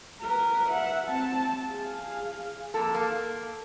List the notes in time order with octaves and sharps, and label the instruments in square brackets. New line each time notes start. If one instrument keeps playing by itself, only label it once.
[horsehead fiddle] A#4 B4
E5 F#5
C4 A5
G#4 F5
[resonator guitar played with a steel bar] F2 A#3 A4
A#3